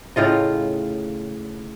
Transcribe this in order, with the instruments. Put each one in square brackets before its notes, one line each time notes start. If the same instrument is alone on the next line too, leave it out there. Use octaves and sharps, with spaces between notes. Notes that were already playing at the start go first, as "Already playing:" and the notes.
[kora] A2 C#3 F4 D#5